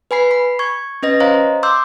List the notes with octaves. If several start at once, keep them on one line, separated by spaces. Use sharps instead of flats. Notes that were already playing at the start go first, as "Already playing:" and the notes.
B4 G#5 B5 C7
B5
C#6 G#6
C#4 B4 D#5 A#6
C5 C#5 D#5 F5 A#5
C6 D6 E6 G6